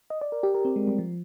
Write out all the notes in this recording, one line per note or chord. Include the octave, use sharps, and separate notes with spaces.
D#5
D5
A#4
G4
A#4
C4
G#3
G3
F3